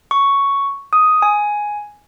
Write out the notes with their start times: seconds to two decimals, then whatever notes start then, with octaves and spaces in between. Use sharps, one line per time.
0.11 C#6
0.93 D#6
1.22 G#5